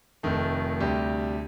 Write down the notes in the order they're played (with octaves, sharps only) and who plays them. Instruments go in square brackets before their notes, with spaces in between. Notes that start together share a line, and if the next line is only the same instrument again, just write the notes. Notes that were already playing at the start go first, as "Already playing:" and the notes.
[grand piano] F1 F2 D#3 A3
D2 C3 G3 D4 G4